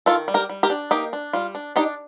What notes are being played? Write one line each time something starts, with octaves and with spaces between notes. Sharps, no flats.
D#3 F4 A4
G3
G4 A#4
G3
G4 A#4
D4
A#3 D#4 G4
D4
G3 F4
D4
D4 D#4 G4